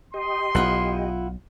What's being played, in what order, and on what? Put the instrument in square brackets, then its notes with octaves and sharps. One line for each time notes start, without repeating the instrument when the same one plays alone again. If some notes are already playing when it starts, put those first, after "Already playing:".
[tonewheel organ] G4 D#5 [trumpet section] C6
[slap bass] B1 [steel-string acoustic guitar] E4 F4 F#5